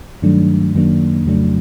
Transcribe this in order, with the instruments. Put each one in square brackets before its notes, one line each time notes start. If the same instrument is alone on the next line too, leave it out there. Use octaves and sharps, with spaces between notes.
[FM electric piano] G2 D#3 F#3 A3 D4
F#2 D#3 F#3 A#3 D4
F2 C#3 F#3 A3 D4